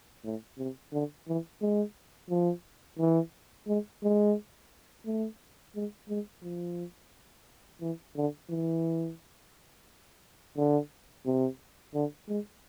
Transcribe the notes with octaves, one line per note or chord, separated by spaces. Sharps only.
A2
C3
D3
E3
G#3
F3
E3
G#3
G#3
A3
G#3
G#3
F3
E3
D3
E3
D3
C3
D3
G#3